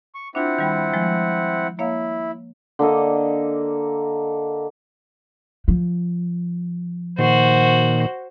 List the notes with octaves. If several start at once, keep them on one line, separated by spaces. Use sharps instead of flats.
C#6
C4 D4 E4 F4 F#5
D#3 G3 B5
F3 G#3 G#6
A#3 E4 C#5 F5
D3 A#3 A4 D#5
F3
A#2 D#3 F#4 C5